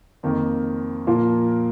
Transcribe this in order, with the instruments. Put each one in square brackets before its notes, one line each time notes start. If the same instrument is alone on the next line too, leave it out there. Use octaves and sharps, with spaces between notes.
[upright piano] F2 D#3 A#3
A#2 F3 A#3 F4